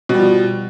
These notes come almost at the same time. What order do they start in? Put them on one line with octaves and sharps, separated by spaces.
B2 G3 F3